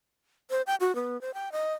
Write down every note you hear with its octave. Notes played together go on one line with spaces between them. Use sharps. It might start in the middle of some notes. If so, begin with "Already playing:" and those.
C5
G5
F#4
B3
C5
G5
D#5